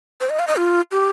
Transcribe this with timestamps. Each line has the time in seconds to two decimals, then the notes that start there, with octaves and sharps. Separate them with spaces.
0.21 C5
0.30 D#5
0.39 F5
0.48 D#5
0.56 F4
0.92 G4